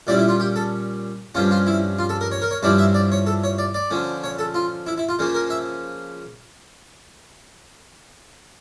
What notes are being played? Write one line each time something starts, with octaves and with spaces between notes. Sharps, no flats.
A#2 G3 C#4 E4 D5
E4
F4
G4
A4
G2 F3 C#4 F4
F4
E4
F4
A4
A#4
C#5
A#4
C#5
G2 F3 C#4 E4 D5
E5
D5
C#5
A4
C#5
D5
D5
D3 F3 C#4
C#5
A4
F4
E4
E4
F4
C#3 F3 A#3 C#4
A#4
E5